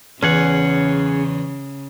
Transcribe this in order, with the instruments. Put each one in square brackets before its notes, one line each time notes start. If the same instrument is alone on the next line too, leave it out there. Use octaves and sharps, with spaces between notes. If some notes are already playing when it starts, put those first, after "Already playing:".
[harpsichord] E2 [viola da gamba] C#3 [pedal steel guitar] C#4 G#4 F#5